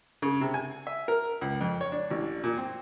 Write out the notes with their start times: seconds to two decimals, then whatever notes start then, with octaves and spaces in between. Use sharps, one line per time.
0.22 C#3
0.41 C3
0.54 G#5
0.87 E5
1.08 A#4
1.41 C#2
1.61 F2
1.81 C#5
1.92 D4
2.11 A1
2.44 A#2
2.57 C4